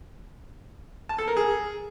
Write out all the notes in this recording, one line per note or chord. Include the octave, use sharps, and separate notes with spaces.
A5
A4
A#4
G#4